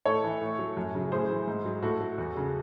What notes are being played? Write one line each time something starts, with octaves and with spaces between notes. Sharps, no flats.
A2 A4 C#5
E3
A2
F#3
F#2
C#3 F#3
A2 G#4 C5
E3
G#2
F#3
A2 F#4 A4
F#3
E2
C#3 F#3